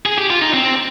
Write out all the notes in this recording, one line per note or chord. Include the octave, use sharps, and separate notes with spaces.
G#4
G4
F4
D#4
C4